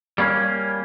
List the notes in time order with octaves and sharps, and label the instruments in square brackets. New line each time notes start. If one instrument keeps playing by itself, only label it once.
[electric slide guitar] G3 A#3 C#4